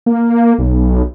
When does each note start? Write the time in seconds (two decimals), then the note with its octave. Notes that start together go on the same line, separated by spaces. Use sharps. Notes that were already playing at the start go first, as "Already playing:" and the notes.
0.06 A#3
0.59 B1